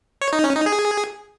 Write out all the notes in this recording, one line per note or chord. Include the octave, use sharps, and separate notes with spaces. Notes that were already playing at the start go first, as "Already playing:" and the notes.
C#5
D#4
C#4
D#4
G#4